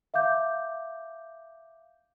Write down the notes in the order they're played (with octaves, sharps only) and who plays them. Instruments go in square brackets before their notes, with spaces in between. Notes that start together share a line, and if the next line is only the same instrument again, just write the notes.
[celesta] E5 F5 D6 G6